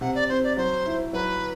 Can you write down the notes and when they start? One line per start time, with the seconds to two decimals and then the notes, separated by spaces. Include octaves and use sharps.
0.01 C3 F#5
0.15 D5
0.29 C4 C5
0.44 D5
0.57 F#3 C5
0.86 E4
1.13 F#3 B4